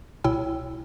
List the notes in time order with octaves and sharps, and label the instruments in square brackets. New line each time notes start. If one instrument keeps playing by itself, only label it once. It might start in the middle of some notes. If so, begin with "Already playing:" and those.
[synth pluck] C2 B2 E4 C#5 G5 E6